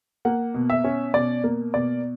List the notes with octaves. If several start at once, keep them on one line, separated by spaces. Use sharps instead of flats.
A#3 F#5
B2
E5
C#4
B2 D5
A#3
B2 D5